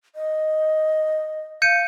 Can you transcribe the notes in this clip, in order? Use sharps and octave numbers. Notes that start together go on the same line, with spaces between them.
D#5
F5 G6 C#7 D#7